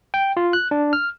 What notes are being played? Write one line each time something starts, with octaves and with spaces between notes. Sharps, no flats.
G5
F4
F#6
D4
F6